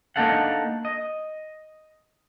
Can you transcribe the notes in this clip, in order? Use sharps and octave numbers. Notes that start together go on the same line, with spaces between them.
A#3 D4 D#4 A4 F5 F#5
D#5